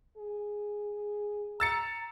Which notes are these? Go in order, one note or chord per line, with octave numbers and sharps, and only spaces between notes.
G#4
A#5 E6 A6 C#7